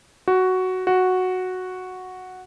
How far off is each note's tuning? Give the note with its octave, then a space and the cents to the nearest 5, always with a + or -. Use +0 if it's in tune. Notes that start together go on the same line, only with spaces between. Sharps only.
F#4 +5
F#4 -5